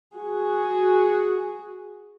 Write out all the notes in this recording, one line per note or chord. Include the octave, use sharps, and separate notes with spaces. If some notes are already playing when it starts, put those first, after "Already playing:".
F#4 G#4